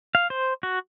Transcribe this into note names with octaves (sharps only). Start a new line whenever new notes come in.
F5
C5
F#4